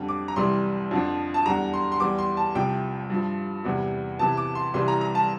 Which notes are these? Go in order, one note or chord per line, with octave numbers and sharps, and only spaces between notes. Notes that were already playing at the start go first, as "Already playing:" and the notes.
Already playing: F2 D3 G3
D6
A#5
C2 C3 E3 G3 C6
F2 D3 F3
A5
E2 D3 G3 A#5
C6
C6
E2 E3 G3 D6
C6
A5
C2 C3 F3 G5
G2 F3
E2 C3 E3 G3
E2 C3 E3 A5
D6
C6
C2 C3 E3 G3 C6
A#5
A#5
A5